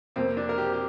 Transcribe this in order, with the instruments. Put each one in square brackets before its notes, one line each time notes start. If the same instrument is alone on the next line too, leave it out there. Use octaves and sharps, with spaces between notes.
[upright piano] F2 C3 A#3 [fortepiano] C4
[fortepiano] D4
A#4
G4
G4